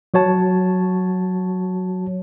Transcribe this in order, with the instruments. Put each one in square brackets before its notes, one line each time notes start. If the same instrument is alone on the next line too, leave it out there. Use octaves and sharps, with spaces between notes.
[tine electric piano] F#3 F#4 C#5 A5